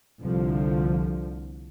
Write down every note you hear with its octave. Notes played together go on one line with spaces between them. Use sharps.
C2 D3 F3